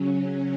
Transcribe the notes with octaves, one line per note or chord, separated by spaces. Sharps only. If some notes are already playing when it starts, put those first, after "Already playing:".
Already playing: C#3 F#3 C#4